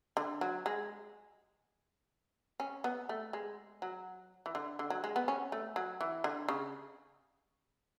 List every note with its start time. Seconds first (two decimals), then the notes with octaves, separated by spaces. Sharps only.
0.17 D3
0.41 F#3
0.66 G#3
2.60 C#4
2.84 B3
3.09 A3
3.33 G#3
3.82 F#3
4.46 E3
4.55 D3
4.79 D3
4.90 F#3
5.04 G#3
5.16 B3
5.28 C#4
5.52 A3
5.76 F#3
6.01 E3
6.24 D3
6.49 C#3